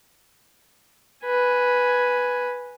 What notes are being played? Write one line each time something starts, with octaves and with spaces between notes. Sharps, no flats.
B4 G#5